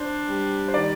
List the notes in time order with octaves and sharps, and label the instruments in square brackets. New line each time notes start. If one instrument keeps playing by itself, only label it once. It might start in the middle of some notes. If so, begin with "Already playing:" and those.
Already playing: [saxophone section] D4 [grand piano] C5
[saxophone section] G3
[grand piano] C5
[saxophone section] D#3 [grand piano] D5